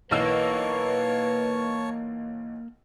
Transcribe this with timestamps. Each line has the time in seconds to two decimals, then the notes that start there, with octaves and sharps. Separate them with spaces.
0.11 B1 E3 A#3 B4 C#5 A5 C#6 E6